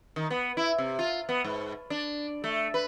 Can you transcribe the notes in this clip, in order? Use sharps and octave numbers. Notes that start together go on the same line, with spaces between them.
D#3
B3
E4
C3
F4
B3
G#2
D4
A3
B4